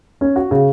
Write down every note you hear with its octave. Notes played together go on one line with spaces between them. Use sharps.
C#4
F#4
C#3